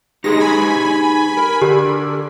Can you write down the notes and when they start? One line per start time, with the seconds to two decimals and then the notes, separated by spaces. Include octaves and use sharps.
0.24 G#3 D#4 G4 G#4 A#6
0.40 G#5 B5
1.37 A#4
1.62 D3 G4